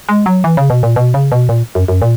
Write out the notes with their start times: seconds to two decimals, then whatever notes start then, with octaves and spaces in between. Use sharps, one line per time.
0.09 G#3
0.26 F#3
0.44 E3
0.57 C#3
0.70 B2
0.83 A#2
0.96 B2
1.14 C#3
1.32 B2
1.49 A#2
1.75 F#2
1.88 F#2
2.02 A#2